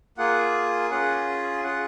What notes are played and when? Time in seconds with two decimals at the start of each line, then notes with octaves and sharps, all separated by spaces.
0.18 A#3 F4 G#4 F#5
0.90 C#4 F4 G#4 F#5
1.63 C#4 F4 G#4 F#5